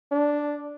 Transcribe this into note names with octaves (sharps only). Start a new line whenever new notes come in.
D4